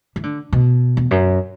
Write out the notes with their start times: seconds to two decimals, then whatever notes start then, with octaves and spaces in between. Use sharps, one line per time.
0.16 E3
0.23 D3
0.52 B2
0.97 E2
1.11 F#2